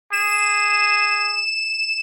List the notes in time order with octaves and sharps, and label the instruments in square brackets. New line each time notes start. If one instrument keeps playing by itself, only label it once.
[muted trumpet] G#4 [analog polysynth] E7